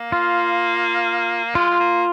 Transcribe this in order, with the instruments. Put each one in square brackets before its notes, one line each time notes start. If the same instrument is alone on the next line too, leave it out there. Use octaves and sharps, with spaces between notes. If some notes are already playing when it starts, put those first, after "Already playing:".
Already playing: [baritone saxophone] A#3
[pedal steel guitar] F4
[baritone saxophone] G#3 [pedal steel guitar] F4
[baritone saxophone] G#3
A#3